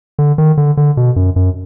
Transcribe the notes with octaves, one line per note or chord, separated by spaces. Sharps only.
D3
D#3
D3
D3
B2
F#2
F#2